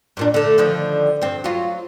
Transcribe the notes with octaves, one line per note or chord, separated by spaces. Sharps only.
G2 A#2 D4
D3 A3
D3 D#3 F3
G2 C4
F#3 F4